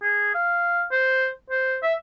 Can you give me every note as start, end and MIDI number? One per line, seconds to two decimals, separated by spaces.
0.02 0.34 68
0.35 0.83 77
0.92 1.27 72
1.50 1.77 72
1.83 1.94 76